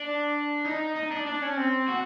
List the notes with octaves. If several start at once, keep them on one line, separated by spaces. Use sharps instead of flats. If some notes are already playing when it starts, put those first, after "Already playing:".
Already playing: D4
D#4
D#4
D4
D4
C#4
C4
F#4